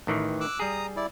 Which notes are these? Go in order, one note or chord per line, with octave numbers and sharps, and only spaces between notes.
A1 D#3 E3
D6 E6 F#6
G3 G#4 A#5 D#6
E4 D5